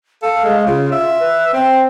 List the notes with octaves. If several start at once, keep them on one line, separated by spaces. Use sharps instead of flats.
A4 F5
G#3
C#3 F4
E5
B4
C4 G5